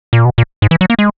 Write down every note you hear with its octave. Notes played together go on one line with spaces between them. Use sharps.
A#2
B2
A#2
G#2
E3
F#3
A#3
G#3